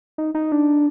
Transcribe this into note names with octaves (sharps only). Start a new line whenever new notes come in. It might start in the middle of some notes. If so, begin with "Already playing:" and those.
D#4
D#4
D4